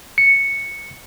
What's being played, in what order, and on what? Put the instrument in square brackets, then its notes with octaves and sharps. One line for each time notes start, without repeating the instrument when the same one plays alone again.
[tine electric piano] C#7